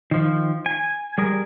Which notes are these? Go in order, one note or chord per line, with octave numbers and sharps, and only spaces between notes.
D#3 F3
G#5
G3 G#4 A#4